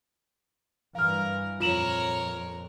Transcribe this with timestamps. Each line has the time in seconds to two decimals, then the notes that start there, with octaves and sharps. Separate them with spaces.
0.95 G2 E3 A#4 F5 F6
1.60 F2 A#2 F4 A#4 C#5 E7 F#7